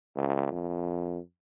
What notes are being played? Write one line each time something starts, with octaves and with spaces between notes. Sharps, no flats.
C#2
F2